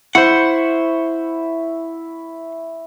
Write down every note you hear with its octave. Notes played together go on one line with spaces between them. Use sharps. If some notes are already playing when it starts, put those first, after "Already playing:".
E4 C5 F#5 C#6